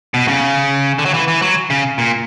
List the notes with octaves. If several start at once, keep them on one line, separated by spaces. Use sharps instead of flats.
B2
C#3
D3
F#3
E3
E3
F#3
C#3
A#2